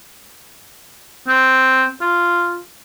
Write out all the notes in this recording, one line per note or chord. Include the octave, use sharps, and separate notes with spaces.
C4
F4